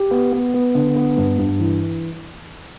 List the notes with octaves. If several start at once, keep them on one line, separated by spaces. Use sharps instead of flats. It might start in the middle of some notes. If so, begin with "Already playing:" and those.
Already playing: G4
B3
B3
B3
D3
B3
G2
G2
E3